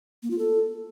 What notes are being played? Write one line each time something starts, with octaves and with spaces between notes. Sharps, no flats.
A#3
F4
A4